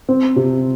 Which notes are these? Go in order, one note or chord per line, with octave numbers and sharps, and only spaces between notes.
C4
C3